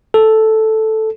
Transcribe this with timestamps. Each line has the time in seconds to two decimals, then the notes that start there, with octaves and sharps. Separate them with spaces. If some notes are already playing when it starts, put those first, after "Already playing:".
0.14 A4